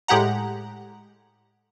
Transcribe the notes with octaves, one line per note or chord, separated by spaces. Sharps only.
A2 G#3 G4 F#5 A#5